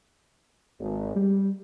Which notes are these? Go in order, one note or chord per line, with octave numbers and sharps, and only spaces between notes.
G#1
G3